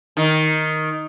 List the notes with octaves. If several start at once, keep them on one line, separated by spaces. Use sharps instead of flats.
D#3